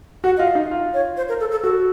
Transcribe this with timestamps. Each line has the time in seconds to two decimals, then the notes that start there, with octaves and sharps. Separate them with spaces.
0.24 F#4 F#5
0.37 F4 D#5
0.48 F5
0.55 D#4
0.71 F4
0.94 C#5
1.17 C5
1.29 A#4
1.40 A4
1.51 A4
1.63 F#4 A4